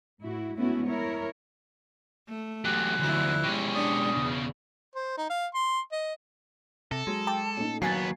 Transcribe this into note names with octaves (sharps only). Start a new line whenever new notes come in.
A2 E4 F#4
G#2 A3 B3 C#4 E4 F#4
E4 A#4 C#5
A3
E2 F#3 E4 G4 F#6
D2 F3 E4
B2 G#3 C#4 G4
D4 D5 D#6
E2 C#3
C5
D#4
F5
C6
D#5
C3 A4 A#6
F#3 G#3
G5 A5 D6
A#2 A3 C#4 D#4
D#2 F#3 B3 F5 G#5 G#6 A6 C7